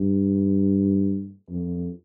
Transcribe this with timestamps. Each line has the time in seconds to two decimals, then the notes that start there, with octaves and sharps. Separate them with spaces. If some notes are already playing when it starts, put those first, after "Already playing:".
Already playing: G2
1.49 F2